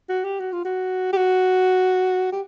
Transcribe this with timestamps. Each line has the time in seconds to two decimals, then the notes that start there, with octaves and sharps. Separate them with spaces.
0.09 F#4
0.25 G4
0.40 F#4
0.52 F4
0.65 F#4
1.13 G4
1.17 F#4
2.32 G4